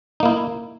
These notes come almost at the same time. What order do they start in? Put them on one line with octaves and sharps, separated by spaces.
D#4 A#3 E4